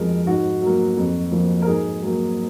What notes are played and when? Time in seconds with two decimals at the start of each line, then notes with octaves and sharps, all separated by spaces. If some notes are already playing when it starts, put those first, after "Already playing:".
Already playing: F2 F3 G#3 A#4
0.26 G#2 F#4
0.62 F#3 A#3
0.97 F2
1.32 F3 A#3
1.62 A#4
1.67 G#2 G#4
2.02 F#3 A#3